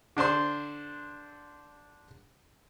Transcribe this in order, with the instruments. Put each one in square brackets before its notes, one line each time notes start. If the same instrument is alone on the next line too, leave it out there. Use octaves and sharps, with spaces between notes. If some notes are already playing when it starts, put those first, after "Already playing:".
[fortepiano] D3 D4 C5 C6